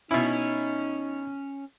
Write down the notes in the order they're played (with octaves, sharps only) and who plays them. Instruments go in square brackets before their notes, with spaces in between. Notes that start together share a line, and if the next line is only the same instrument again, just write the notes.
[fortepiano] B2 E4 [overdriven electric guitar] C#4 [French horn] D#4